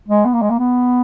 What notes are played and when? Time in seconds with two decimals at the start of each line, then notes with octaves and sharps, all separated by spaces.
0.08 G#3
0.25 B3
0.33 A#3
0.42 G#3
0.50 A#3
0.59 B3